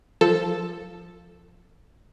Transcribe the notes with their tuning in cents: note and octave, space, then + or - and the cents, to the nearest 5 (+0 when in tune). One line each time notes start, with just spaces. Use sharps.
F3 +0 A4 +0